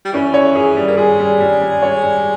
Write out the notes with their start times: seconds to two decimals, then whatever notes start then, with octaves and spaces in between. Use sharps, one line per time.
0.05 G3
0.13 E3 C#4
0.34 C#5
0.55 G#4
0.77 G3
0.88 A#3
0.97 G#3 G#4
1.19 G3
1.40 G3
1.62 G3
1.82 C#5
2.03 G3